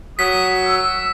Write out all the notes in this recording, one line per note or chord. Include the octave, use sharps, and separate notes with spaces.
F#3 D#6 B6
E6